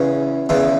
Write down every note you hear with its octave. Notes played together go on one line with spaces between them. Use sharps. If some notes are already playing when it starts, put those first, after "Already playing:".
Already playing: E2 C#3 E3 C#4
E2 C#3 E3